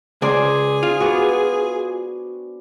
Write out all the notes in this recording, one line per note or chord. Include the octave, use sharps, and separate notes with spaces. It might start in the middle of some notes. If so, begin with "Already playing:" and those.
C#2 G#4 C5 D5 G#5
F4
B3 D4 F#4